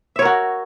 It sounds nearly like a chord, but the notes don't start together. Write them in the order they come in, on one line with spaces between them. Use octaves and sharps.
E5 C#5 A#4 F#4